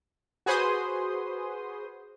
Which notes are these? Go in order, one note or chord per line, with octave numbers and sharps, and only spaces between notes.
F#4 G#4 B4 C5 C6 D#6